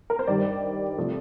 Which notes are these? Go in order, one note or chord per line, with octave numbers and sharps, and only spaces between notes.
A#4
C5
G2 D#3 G3 D5
C3 F3 A3